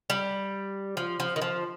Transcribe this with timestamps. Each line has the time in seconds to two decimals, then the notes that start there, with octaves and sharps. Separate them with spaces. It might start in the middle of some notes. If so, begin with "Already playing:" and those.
0.10 G3
0.97 F3
1.20 F3
1.36 D#3
1.41 F3